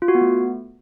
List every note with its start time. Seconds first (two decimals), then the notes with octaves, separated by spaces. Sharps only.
0.02 F4
0.08 F#4
0.15 B3
0.21 A3